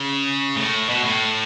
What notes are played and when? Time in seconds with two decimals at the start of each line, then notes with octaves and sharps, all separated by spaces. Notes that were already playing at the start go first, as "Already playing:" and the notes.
Already playing: C#3
0.57 A2
0.89 B2
1.04 A2